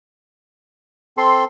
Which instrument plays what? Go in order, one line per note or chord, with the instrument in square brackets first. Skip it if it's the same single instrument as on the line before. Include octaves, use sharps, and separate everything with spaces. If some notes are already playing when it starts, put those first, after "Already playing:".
[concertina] C4 A4 [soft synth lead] C6